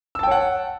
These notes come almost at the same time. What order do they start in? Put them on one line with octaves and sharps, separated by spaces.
E6 A5 G5 C#5 F#5